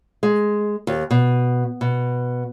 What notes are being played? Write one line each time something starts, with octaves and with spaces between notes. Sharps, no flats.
G#3
D#2
B2
B2